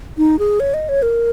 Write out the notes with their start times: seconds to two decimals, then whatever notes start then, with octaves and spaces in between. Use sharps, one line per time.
0.18 D#4
0.39 G#4
0.60 C#5
0.74 D#5
0.89 C#5
1.02 A#4